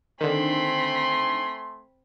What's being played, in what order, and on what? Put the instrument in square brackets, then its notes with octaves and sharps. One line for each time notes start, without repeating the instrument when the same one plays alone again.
[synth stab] D3 D#3 [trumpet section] A3 G#5 C6 [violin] C4 B5